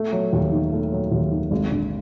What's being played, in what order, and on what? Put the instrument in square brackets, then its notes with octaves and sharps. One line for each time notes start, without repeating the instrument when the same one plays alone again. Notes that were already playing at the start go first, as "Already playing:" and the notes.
Already playing: [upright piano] A3
F#3
D#2
D#3
A3
F#3
D#2
D#3
G#1
D3